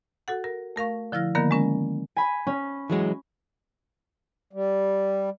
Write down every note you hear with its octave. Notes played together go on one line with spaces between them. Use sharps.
F#4 A4 F#5
A#4
A3 A#4 F5 C#6
D3 F3 E4 F6 A#6
D3 D#3 F3 A#3 B3 A#4
G#3 C#4 A#4
G#5 B5
C#4
E3 F#3 G#3
G3